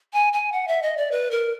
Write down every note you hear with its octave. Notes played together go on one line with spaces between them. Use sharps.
G#5
G#5
F#5
E5
D#5
D5
B4
A#4